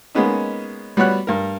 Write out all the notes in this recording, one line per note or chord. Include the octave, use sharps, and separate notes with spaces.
G#3 A#3 B3 C#4 D#4
G3 B3 F#4 C#5 F#6
G2 A#4